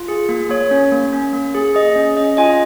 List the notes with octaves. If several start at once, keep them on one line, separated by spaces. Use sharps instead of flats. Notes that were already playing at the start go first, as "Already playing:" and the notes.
Already playing: F4
G#4
A#3
A#3 C#5
C#4
A#3
C#4
A#3
G#4
G#4 D#5
C#4
C#4 D#5
F4 D#5 G#5